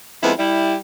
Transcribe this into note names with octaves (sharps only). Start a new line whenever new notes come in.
F2 G#3 B3 E4
G3 E4